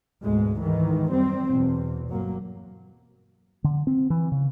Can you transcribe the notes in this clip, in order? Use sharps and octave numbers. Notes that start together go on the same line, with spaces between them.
D2 G#2 B2 G#3
G#2 D#3 E3
F#2 G3 C4
E2 B2
G1 F#3 A#3
D3
C4
E3
C#3